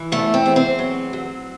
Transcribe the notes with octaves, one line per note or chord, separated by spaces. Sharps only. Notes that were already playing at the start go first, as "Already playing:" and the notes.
Already playing: E3
E2 A3
C4
E2
C4
F#3
F#3